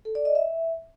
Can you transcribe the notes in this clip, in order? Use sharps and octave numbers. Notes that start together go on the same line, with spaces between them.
A4
D5
D#5
E5